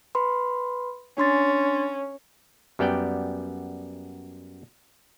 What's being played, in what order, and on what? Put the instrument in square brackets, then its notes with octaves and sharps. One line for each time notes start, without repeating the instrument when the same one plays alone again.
[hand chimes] B4 B5 C6
[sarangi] C#4 [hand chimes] D4 C6 A6
[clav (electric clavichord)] F#2 G3 B3 D5 G5